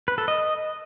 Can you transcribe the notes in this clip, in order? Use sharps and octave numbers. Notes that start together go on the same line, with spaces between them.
B4
A4
D#5